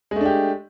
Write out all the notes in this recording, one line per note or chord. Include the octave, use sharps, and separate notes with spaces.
G#3 A3 D4 G4